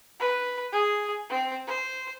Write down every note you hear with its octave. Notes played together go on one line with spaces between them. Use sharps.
B4
G#4
C4
C5